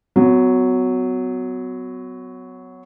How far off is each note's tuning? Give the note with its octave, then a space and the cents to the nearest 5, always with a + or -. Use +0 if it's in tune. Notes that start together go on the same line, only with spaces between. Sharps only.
F#3 +0 B3 +35